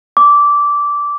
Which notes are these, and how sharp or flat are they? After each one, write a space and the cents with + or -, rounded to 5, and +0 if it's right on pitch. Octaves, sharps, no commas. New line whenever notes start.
D6 -15